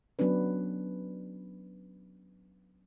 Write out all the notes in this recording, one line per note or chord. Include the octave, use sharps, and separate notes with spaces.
F#3 B3 C#4 D4 B4